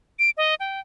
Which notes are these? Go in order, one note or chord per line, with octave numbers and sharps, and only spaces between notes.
D7
D#5
G5